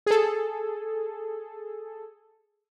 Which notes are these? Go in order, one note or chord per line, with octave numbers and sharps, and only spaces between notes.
G#4 A4